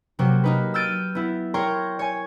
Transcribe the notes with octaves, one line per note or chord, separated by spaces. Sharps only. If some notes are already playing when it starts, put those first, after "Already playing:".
C3 F#3 A#3 F#4 G4
A#3 D#4 B4
E6 F6 G6 A6 D7 D#7
B3 E4
A#4 C#5 G5 A#5 C6 C#6
C#5 G#5